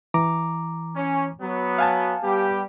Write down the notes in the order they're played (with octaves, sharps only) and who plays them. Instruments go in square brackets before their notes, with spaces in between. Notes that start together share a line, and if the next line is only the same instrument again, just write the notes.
[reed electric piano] E3 A#5 D6
[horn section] C#4
F#3 B3
[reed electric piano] F5 G#5 A5
[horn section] G3 B3 G4